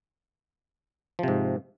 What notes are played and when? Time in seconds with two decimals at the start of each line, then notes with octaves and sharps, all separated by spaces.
1.19 F3
1.23 C3
1.28 G#2